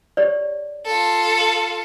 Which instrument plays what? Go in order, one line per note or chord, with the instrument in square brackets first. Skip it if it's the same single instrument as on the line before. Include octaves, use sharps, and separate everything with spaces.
[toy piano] G4 C#5 D5
[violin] F4 A4